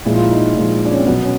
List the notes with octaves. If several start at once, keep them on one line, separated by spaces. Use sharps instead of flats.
A#2 F3 G#3 E4
F4
E4
D#4
A#2 F3 G#3
D4
C#4
C4
B2 F#3 B3
C#4